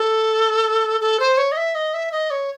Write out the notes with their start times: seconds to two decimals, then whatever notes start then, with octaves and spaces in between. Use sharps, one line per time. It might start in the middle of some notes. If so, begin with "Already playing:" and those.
Already playing: A4
1.01 A4
1.20 C5
1.38 C#5
1.52 D#5
1.57 E5
1.75 D#5
1.94 E5
2.12 D#5
2.30 C#5